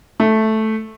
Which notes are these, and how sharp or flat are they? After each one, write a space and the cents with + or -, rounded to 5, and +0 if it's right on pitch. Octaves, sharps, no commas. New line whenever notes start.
A3 -5